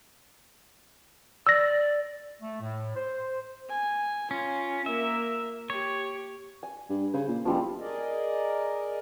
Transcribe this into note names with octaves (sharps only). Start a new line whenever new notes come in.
D5 E6 A#6
A3
A2
C5
G#5
C#4 F4
A#3 A#4 E5
G4 C#5
G#5
G2
C#3 C5
A#2
E1 F3 G3 C4
G#4 A#4 D5 D#5